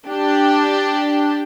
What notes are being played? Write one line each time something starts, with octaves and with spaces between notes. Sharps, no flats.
D4 G4